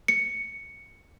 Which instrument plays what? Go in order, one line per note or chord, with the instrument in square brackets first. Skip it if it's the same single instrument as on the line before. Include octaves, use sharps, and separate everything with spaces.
[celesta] C#7